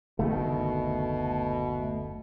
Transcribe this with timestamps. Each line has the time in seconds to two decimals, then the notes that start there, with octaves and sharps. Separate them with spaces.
0.19 F#1 D2 B2 D#3 A3